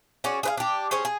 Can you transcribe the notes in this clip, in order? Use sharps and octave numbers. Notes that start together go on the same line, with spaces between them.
C#4 F#4 G#4 D5
G#4 B4 F5
D4 G4
C#4 G#4 C5 C#5
G#4